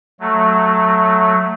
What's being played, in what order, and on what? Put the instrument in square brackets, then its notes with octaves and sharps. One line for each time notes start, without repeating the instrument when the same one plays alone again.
[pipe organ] F#3 A3